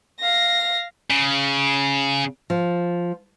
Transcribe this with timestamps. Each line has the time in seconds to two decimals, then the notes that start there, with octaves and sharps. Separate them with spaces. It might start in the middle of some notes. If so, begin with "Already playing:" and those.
0.20 F5 A#6
1.10 C#3
2.50 F3